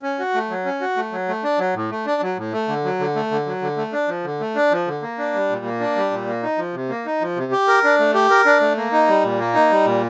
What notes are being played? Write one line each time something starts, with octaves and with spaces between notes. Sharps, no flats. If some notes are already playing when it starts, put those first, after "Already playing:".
C#4
F#4
A3
F#3
C#4
F#4
A3
F#3
A3
D4
F#3
A2
A3
D4
F#3
A2
A3
D3
F#3
D3
A3
D3
F#3
D3
A3
D4
F3
D3
A3
D4
F3
D3
A#3
D4
G3
A#2
A#3
D4
G3
A#2
A#3
D#4
F3
C3
A#3
D#4
F3
C3
G4
A#4
D4
A3
G4
A#4
D4
A3
A#3
D#4
G3
A#2
A#3
D#4
G3
A#2